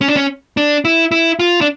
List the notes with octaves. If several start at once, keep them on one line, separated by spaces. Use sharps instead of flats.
C#4
D4
C#4
D4
E4
E4
F4
D4